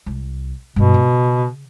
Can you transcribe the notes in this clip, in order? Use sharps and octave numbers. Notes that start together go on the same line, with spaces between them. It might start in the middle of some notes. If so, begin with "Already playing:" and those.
C2
G2 B2 A3
C#3